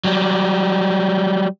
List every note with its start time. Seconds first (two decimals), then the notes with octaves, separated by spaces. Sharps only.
0.04 F#3 G3